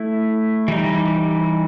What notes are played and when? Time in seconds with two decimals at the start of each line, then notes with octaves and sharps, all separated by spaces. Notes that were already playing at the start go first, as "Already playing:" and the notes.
Already playing: A3 E4
0.68 E3 G3 D#4